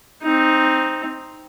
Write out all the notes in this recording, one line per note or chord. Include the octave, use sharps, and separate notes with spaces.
C4 D#4